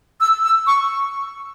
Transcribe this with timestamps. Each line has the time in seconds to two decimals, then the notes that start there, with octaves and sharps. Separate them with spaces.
0.21 E6
0.44 E6
0.67 C#6